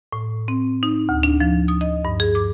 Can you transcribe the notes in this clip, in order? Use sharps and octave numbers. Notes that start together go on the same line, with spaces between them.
A2
C4
D#4
D2
D4
F3
D#6
D#5
G2
G#4
D6